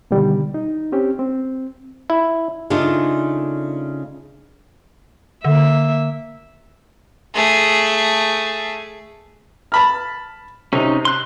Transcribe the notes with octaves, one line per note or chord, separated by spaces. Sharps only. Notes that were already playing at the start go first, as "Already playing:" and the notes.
B2 D3 D#3 G3
D#4
C4 C#4 G4
C4
E4
C#3 A3 D4 D#4 F4
D3 A#3 E5
A3 G#4
A5 B5 F6
C3 C#4 D#4
C6 F#6